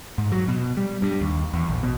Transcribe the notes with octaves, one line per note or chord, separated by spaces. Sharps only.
G#2
F#3
B2
G3
G2
D#2
E2
A#1
B2